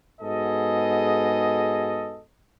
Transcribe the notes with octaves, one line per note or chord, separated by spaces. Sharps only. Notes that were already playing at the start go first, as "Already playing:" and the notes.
G#2 B3 F#4 G#4 A4 D#5